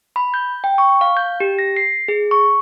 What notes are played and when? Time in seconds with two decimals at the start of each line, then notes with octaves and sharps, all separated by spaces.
0.16 B5
0.34 G6
0.64 G5
0.78 C#6
1.01 F5
1.17 G6
1.40 G4
1.59 A#6
1.76 C7
2.08 G#4
2.31 C#6